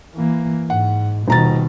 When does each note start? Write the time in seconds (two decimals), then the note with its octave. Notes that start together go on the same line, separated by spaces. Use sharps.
0.15 E3 A#3
0.70 G#2 F#5
1.28 D#1 B2 D#3 A#5 A6